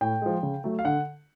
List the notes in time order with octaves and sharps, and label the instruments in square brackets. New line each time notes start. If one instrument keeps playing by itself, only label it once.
[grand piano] A2 G5
F3 G#3
C#3
F#3 A3
F5
D3 F#5